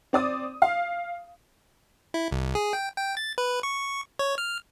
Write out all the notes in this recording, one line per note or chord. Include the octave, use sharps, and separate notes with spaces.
C4 D5 D#6
F5
E4
C2
G#4
G5
G5
A6
B4
C#6
C#5
F6